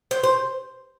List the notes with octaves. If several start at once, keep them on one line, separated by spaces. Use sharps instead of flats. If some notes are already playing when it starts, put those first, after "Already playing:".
C5
C5